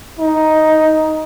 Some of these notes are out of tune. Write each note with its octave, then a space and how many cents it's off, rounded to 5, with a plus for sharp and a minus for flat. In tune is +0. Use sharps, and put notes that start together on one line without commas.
D#4 +5